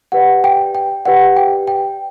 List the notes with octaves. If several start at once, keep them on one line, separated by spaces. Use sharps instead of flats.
G4 B4 D5 F#5
G5
G5
G4 B4 D5 F#5
G5
G5